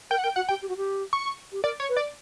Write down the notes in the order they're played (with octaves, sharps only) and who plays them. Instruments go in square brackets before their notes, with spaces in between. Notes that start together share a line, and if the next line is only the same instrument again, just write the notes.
[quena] A#4 [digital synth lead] G5
[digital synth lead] F#5
[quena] A#4 [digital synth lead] G5
[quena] F#4 [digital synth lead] F#5
[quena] G4 [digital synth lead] G5
[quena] G4
F#4
G4
[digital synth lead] C#6
[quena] G4
[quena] A#4 [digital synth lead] D5
[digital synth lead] C#5
[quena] B4
[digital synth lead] D5